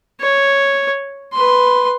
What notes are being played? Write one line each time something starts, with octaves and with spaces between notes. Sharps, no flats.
C#5
B4 C6